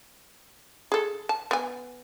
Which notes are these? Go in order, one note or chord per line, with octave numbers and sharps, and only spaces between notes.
G#4 A4
A5
B3 G#5